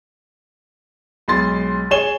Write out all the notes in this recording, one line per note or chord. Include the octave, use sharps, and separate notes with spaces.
B1 G#3 C6 A6
G#4 C#5 E7 G7